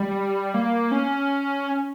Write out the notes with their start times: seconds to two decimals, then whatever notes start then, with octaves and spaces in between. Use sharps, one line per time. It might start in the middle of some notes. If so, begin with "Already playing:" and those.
Already playing: G3
0.54 A#3
0.91 C#4